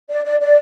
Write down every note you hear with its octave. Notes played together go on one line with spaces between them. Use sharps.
D5
D5
D5